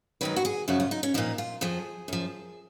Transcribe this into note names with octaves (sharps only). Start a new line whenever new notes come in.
G#2 D#3 F#3 B4
F#4
G#4
F#2 C#3 F3 F#4
F4
D#4
C#4
A#2 F3 D#4
F4
F2 F3 G#4
F#2 F3